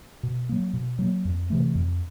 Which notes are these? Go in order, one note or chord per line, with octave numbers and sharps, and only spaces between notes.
B2
F#3 A#3
B2
F#3 A#3
F2
C3 E3 A3
F2